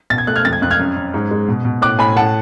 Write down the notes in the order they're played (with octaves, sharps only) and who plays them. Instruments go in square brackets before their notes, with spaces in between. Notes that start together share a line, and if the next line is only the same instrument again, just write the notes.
[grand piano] B2 A6
G#6
A3 F#6
F6 G#6
F2 A6
G#6
F2 F#6
F6 G#6
F#2
F#2
G#2
G#3
B2
B2
A2 D6 F#6
A2 G#5 B5
A2 F#5 A5